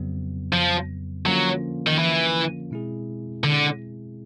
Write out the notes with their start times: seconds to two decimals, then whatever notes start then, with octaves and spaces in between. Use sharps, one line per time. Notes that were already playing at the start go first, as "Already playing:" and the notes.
Already playing: F2 C#3 F#3 B3
0.53 F3
1.26 D3 F3 F#3 A#3 C#4 F4
1.87 D#3
1.99 E3
2.71 B2 G#3 C4 E4 G#4
3.44 D3